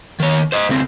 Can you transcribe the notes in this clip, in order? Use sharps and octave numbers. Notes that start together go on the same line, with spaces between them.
D#3 C#5
C5 D#5
C#2 C4